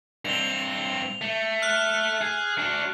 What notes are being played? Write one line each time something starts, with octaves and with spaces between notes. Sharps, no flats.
G2 C4 F7 G7
A3
F6 F#6
G#4
D4 F#4